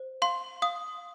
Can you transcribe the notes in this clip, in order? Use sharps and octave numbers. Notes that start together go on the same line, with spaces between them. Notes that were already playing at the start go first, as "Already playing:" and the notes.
Already playing: C5
F5 C6
F5 D#6